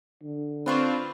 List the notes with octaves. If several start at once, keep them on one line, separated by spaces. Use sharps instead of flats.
D3
C4 D4 F4 B4 C5 C#6